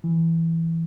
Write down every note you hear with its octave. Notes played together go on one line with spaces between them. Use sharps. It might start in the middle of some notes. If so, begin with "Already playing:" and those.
E3